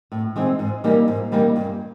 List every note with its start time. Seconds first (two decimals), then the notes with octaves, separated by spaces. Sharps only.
0.12 A2
0.36 E3 G#3 C4 D#4
0.59 G#2
0.84 E3 G3 A#3 D#4
1.08 G#2
1.32 E3 G3 A#3 D#4
1.56 G2